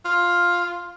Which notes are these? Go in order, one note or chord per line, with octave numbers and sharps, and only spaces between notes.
F4